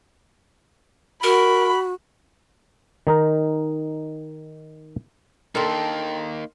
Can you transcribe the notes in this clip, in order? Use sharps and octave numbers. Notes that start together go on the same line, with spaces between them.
F#4 A#4 B5
D#3 D#4 A#4
A#3 D4 D#4 A4 A#4 G5 C6